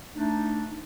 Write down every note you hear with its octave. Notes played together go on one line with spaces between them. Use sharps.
A3 D4 D#4